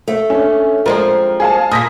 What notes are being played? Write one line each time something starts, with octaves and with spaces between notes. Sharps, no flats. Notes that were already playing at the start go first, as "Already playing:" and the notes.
A3
C#4 D4
G2 F3 G#3 C4 A#4
G#4 F5 A5
A#2 A#3 D#6 A#6 B6